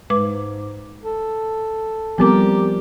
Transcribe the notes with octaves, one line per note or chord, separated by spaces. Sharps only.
G#2 G#3 B4 D6
A4
F3 G3 B3 C4 G4 A#4 D6